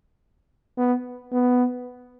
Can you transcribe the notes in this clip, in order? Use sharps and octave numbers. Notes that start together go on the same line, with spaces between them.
B3
B3